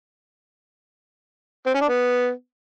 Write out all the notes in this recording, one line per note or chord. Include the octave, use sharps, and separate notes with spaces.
C4
C#4
D4
B3